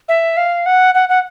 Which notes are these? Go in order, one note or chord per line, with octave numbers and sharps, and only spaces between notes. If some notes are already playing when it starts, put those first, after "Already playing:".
E5
F5
F#5
F#5
F#5